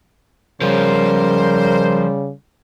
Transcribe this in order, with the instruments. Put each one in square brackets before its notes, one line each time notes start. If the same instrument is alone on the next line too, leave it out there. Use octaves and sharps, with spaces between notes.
[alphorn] C#3 [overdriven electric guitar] F3 C#4 [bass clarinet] G3 [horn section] A#4 C5